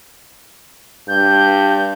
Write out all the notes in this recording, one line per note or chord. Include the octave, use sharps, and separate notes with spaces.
G2 G6